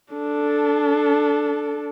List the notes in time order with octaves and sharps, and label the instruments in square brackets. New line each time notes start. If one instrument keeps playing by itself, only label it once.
[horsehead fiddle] D4 A4